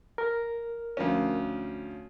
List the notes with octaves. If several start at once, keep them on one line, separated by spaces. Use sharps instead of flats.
A#4
D2 F3 C#4